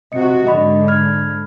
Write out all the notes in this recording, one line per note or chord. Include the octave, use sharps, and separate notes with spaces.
C3 F#4 D#5 C#7
G#2 D3 D#5 B5 C#6
B5 F6 G#6